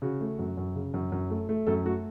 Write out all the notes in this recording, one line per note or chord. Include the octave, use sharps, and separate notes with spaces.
C#3 F#4
A3
F#2
F#2
C#3
F#2
F#2
A3
A3
F#2 A4
A3 F#4